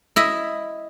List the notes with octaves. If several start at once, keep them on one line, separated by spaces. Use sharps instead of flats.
E4 D#5 E5